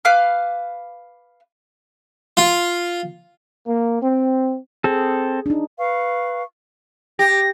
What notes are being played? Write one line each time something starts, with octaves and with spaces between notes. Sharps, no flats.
B4 F5 D6 F6
F4
A#3
C4
C4 G#4 A4
D4 D#4
B4 F5 C#6
G4 A#6